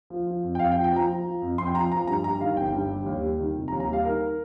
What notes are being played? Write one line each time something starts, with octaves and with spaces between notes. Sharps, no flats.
F3
F3
F2
G5
F2 F5
G5
F3
G5
F3 A#5
F3
F3
F2
F2 C6
G5
F3 A#5
F3 A#5
G2 A#5
G3 A#5
D#3 F5
G1 G5
G2
G3
D#2
G3
D#3
F1
A#5
D#2
A#5
G3 F5
D#3 A#4